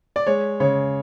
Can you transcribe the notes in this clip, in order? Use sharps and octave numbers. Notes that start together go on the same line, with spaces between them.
D5
G#3 C#5
C#3 C#5